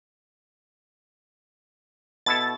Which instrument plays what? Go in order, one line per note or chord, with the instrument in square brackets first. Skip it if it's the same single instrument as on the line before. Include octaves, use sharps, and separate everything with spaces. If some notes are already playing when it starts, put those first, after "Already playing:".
[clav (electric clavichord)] B2 E4 A4 [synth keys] A6